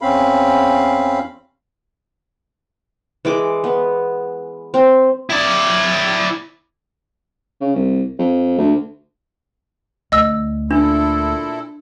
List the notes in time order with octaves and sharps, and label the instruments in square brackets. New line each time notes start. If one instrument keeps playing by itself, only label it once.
[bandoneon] E2 C4 C#4 F5 B5
[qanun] E3 G#3 D6
B3
C4
[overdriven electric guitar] E4 D5
[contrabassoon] C#3
C2
F2
D2
[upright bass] D2 [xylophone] D#5 E6
[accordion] A#2 E4 A4 [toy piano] D4